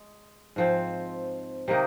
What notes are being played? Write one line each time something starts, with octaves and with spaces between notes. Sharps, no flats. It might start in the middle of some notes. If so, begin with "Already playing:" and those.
Already playing: G#3
G#2 F3 C4
C3 D#3 A#3 D#4